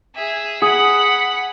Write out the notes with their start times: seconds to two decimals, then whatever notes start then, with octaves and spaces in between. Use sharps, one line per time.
0.15 G#4 E5
0.62 G#4 F#5 B5